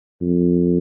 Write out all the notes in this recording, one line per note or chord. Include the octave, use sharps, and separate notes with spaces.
F2